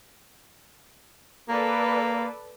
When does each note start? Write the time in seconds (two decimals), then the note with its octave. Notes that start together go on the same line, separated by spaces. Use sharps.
1.49 A#3 A4 B4 D5